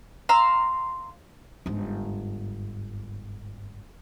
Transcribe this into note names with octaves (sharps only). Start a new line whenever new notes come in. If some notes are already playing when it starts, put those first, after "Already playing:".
F5 A#5 C6 E6
G1 G#2